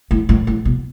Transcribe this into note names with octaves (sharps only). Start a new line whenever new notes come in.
A2
A2
A2
B2